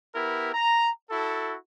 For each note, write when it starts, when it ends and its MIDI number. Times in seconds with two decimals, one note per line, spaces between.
0.15 0.50 59
0.15 0.50 64
0.15 0.50 67
0.15 0.50 70
0.54 0.90 82
1.11 1.55 64
1.11 1.55 66
1.11 1.55 69